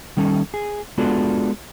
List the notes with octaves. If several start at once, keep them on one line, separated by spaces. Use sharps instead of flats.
D#3 G3 C#4 A4
G#4
G#3 B3 D4 F4 F#4 A4